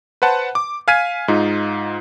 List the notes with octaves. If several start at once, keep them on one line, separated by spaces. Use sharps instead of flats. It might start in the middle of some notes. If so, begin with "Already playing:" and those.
B4 C5 F#5 A5
D6
F5 G#5 F6 G#6 B6 D#7
G#2 D#4 F4